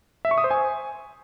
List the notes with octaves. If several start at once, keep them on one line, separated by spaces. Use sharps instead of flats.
E5
C#6
D#6
C5
G#5